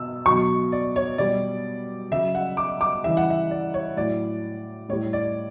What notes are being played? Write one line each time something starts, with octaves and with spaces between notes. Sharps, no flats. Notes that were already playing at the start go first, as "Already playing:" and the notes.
Already playing: B2 E6
B2 F#3 C#6
D5
C#5
B2 G3 D5
C#3 F#3 E5
F#5
D6
D6
C#3 E3 G3 E5
F#5
E5
D5
C#5
A2 F#3 D5
A2 G3 C#5
D5